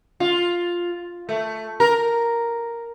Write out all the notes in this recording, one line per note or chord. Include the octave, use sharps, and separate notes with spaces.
F4
A3
A#4